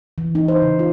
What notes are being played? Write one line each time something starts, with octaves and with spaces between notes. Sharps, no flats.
E3
D#4
C5
C#3
F4